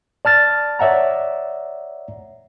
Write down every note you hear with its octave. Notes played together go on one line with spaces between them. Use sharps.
D5 A5 F6 A6
C#5 D5 E5 F#5 A#5